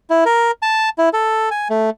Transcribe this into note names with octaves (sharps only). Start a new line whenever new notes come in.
E4
A#4
A5
E4
A4
G#5
A3